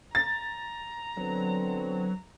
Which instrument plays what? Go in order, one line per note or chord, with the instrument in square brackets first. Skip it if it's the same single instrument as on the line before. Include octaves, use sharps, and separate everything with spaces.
[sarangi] A#5 [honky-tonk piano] A6
[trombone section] D3 B3 C4 [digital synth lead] F#3